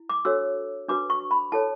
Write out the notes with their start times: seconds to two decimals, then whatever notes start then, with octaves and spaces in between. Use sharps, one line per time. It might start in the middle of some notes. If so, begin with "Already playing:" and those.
Already playing: E4
0.09 D6
0.25 D4 F#4 A4 C#5 E6
0.89 D4 F#4 B4 D6
1.10 C#6
1.31 B5
1.52 E4 A4 C#5 A5